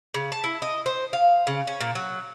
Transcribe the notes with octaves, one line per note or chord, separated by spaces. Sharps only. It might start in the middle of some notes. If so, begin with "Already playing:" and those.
C#3
A5
E4
D#5
C5
F5
C#3
C#4
A#2
F#3